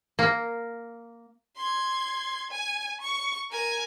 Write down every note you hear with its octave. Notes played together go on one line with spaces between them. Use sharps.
A#3
C6 G#6
G#5
C#6
A#4 G#5